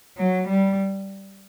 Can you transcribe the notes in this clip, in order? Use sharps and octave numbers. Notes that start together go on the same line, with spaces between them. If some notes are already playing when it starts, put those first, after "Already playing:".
F#3
G3